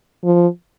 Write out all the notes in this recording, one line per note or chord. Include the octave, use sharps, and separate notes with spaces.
F3